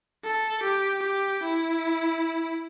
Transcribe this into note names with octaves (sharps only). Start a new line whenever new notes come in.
A4
G4
G4
E4